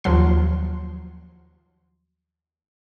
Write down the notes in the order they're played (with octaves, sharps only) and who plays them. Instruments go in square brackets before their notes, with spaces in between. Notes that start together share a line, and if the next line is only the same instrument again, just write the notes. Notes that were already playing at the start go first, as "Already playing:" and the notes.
[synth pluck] D#2 F3 F#3 C6